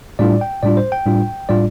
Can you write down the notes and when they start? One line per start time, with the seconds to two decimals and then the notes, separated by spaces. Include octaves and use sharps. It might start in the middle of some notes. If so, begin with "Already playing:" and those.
0.19 A2 G3 D4 F4 D5
0.41 G5
0.63 A2 G3 D4 F4 D5
0.77 C5
0.92 G5
1.06 A2 G3 D4 F4
1.49 A2 G3 D4 F4 D5